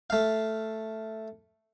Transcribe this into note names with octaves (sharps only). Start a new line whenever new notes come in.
A3 F5